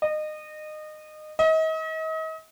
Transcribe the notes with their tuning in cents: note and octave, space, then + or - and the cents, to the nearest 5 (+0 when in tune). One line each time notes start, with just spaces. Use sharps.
D#5 -25
D#5 +40